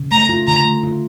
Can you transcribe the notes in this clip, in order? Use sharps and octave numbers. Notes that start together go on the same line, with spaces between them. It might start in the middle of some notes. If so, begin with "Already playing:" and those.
Already playing: C#3
A3 A#5
F4
D3 A#5
A3
F4